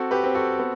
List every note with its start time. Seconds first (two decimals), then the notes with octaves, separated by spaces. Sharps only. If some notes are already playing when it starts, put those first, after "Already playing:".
Already playing: C4 F#4 A4
0.11 G4 B4
0.24 C4
0.35 F#4 A4
0.59 B3